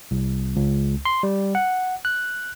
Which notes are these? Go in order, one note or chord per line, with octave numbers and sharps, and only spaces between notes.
C2
C#2
C6
G3
F#5
F#6